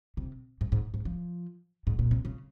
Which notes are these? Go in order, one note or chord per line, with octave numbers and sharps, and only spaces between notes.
C3
G#2
G#2
G#2
F3
G#2
A#2
C3
C#3